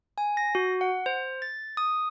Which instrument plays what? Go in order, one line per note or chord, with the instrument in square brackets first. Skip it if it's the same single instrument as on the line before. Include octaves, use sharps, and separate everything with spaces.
[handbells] G#5
A#6
F#4
F#5
C5
A6
D#6